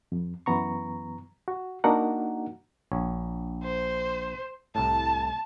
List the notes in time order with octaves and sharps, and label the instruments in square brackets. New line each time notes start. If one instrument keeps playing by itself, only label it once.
[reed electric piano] F2
F#2 E3 B3 A#5 C#6
F#4
A#3 D4 D#4 F#4 A#4 F#5
[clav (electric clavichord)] A#1 C#5
[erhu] C5
[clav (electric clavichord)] C2 A2 [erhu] A5